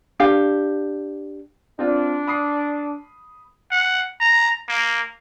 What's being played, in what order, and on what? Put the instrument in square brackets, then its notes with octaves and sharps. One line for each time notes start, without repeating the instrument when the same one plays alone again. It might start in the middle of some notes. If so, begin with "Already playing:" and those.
[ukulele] D4 G4 F5
[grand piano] C4 F4 [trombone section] D4
[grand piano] B5 D#6 C7
[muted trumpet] F#5
A#5
A#3